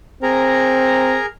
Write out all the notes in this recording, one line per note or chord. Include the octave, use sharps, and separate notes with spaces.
C4 G#4 A#4 A#5